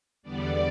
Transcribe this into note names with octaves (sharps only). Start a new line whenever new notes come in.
E2 D3 G3 B3 D4 D5